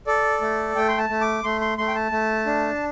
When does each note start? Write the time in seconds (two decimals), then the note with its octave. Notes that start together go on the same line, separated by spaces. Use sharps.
0.07 A4 D5
0.41 A3
0.75 A3 G5
0.89 C6
0.98 A5
1.09 A3
1.21 D6
1.44 A3 C6
1.61 C6
1.78 A3 C6
1.88 G5
1.95 A5
2.12 A3
2.46 D4